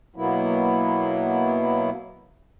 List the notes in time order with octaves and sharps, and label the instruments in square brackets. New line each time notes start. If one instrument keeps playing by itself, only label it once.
[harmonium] B2 F#3 A#3 B3 E4